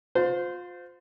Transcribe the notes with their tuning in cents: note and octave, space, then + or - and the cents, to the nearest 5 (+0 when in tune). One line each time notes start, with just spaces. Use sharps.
F4 +30 C5 -20